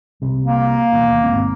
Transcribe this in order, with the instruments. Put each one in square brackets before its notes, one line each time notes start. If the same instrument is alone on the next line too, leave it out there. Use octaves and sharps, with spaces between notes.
[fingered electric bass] C2 C3
[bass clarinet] A#3
[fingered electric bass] A1 D#2 B2
G1 G#2 C4